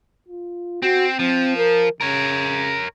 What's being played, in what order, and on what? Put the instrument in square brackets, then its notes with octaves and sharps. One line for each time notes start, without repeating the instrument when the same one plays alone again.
[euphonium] F4
[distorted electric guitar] C4 [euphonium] F#4
[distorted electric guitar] F3 [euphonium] C4
[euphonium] A#4
[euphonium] C#3 [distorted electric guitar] A#4 C#5